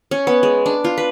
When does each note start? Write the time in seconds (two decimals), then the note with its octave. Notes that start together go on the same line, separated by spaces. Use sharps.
0.11 C#4
0.27 B3
0.43 G#3
0.66 D4
0.84 F4
0.98 B4